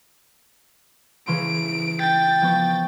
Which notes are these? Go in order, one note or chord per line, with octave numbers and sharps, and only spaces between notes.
C#3 E3 C6 D7
G5 A6
F3 B3 C#6